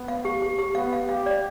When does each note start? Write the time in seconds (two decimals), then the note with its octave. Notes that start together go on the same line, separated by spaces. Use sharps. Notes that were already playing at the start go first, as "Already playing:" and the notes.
Already playing: B3
0.08 F5
0.25 G4
0.42 G4
0.59 G4
0.75 B3 F5
0.93 F5
1.09 G4 F5
1.26 D5